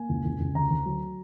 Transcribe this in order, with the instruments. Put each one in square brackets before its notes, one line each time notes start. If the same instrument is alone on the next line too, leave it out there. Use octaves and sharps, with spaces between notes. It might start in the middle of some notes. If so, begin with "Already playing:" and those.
Already playing: [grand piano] A#3 G#5
C#2
C#2
C#2
D2 A#5
D2
F#3